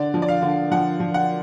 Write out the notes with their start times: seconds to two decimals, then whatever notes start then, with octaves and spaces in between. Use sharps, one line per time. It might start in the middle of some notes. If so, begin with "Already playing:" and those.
Already playing: D3 D5
0.14 F3
0.22 D5
0.28 F5
0.42 D3
0.71 F3 F#5
1.00 F3
1.14 F#5